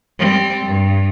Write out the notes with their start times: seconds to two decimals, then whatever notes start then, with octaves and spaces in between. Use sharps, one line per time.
0.19 G3 C4
0.66 G2